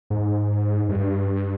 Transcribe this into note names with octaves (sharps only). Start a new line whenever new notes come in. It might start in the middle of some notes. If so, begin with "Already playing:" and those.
G#2
G2